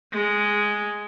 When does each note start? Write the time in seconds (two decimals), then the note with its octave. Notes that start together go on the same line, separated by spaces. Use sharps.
0.11 G#3